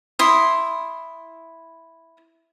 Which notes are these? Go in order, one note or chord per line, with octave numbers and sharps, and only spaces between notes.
E4 C6 D#6